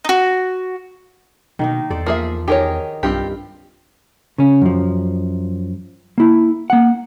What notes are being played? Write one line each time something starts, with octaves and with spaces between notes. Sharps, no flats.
D#4 F#4
B2 D#3 A#3 D#4
E2 A4 C5 D5
F3 A#3 G#4 E5
D#3 G4 G#4 A#4 C#5 D#5
B1 G2 C4 F4 G4
C#3 C#4
F#2 F3
A#3 E4
A#3 F#5